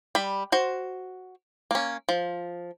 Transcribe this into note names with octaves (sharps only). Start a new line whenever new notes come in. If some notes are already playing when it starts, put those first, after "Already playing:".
G3 B5
F#4 C5
A#3 C#4
F3